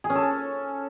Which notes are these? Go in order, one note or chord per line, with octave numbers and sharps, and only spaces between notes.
G#4
C#4
A4